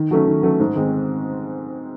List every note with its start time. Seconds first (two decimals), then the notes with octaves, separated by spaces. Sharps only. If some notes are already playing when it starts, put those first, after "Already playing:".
Already playing: D#3
0.11 F#3 A3 C#4
0.27 D#3
0.43 F#3 A3 C#4
0.60 G#2
0.76 D#3 G#3 C4